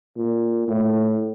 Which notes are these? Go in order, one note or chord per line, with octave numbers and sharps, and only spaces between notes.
A#2
A2